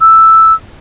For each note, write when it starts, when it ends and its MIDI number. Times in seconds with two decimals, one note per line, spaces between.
0.01 0.53 88